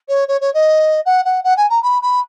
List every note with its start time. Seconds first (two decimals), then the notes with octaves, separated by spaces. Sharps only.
0.08 C#5
0.28 C#5
0.41 C#5
0.54 D#5
1.05 F#5
1.25 F#5
1.44 F#5
1.57 G#5
1.70 A#5
1.82 B5
2.02 B5